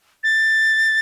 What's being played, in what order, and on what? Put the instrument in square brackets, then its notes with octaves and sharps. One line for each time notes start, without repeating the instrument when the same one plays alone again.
[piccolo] A6